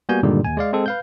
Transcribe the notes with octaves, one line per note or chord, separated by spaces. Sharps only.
G3 A#3 B3 F#4 G#5 G6
G2 A#2 D3 D#3 G3 G#3
D#2 G#5
G#3 D5 F5
G#3 C4 A4
B4 F5 G6